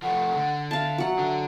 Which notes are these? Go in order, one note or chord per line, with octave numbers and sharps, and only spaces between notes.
F3 A3 F#5
D3
E5 F5 A5
F#3 F#5
D3